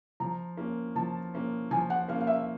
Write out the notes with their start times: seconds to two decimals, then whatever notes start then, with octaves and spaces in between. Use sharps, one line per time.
0.20 F3 A#5
0.57 A#3 C#4
0.95 F3 A5
1.34 A#3 C#4
1.71 F3 G#5
1.90 F#5
2.08 A#3 F5
2.12 C#4
2.21 F5
2.27 E5